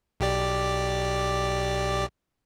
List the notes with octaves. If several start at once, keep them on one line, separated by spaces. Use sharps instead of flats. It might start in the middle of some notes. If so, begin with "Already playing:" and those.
B1 G4 D5